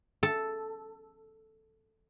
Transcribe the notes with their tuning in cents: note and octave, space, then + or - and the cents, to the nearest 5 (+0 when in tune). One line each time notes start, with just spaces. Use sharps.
A4 +0